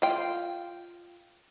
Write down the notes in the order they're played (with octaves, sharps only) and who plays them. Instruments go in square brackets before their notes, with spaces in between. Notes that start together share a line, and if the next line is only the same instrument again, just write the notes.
[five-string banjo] F4 G5